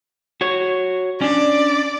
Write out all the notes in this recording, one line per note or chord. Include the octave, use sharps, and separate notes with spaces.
F#4 C#5
C#4 D4 D5